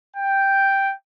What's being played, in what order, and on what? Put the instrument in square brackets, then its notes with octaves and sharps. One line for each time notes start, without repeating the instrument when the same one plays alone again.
[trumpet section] G5